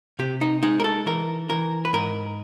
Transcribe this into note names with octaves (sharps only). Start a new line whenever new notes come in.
C3 G4
D#4
G#3 D#4
A#4
A4
E3 A#4
E3 A#4
B4
G#2 A#4